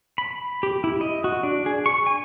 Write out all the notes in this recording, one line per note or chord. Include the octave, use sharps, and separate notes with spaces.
B5
G4
E4
D#5
F#4
D4
G#4
C#6
G#5